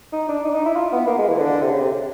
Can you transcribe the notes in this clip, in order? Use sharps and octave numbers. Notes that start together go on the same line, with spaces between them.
D#4
D4
D#4
D4
D#4
E4
F4
B3
A#3
G#3
E3
D3
C3
C#3
C3